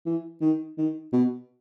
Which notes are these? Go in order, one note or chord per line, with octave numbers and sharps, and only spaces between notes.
E3
D#3
D#3
B2